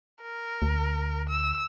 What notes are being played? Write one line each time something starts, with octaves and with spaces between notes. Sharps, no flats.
A#4
D2
E6